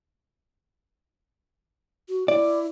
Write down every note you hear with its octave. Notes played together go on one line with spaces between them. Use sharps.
F#4
E4 D5